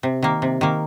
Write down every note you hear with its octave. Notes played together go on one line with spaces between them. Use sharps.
C3
D#3 A#3
C3
D#3 A#3